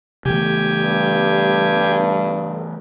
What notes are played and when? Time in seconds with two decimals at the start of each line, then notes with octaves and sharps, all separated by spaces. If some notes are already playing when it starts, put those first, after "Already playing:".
0.25 C#3 E3 A3 G4 G#5
0.82 G2